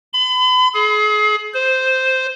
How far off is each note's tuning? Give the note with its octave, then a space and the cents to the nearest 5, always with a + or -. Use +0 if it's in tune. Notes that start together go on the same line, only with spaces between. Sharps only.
B5 +40
G#4 +35
C5 -5